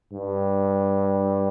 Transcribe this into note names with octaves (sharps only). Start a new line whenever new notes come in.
G2